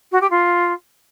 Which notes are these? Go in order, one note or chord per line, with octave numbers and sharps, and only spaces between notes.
F#4
G4
F4